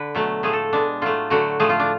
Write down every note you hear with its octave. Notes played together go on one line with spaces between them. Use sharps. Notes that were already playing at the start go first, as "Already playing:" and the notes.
Already playing: D3 B4
B2 F#3 A3
A2 F3 A3 G#4
A4
B2 G#3 D4
A2 F#3 A3 F4
D3 F#3 A3 F#4
A2 F3 A3 G#4
F4
D4